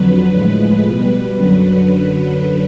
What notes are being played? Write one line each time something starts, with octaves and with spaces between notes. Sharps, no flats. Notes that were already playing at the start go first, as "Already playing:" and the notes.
Already playing: F2 D3 F#3 B4
A2 F3 G#3 B4
B2 G3 B4
F#2 D3 F#3